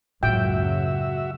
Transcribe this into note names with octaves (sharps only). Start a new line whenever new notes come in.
C#2 F#2 A2 F#3 A#3 F#4 E5 G5